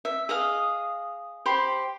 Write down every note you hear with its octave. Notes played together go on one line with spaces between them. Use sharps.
E5
G#4 D#5 F5
G4 C5 B5 C6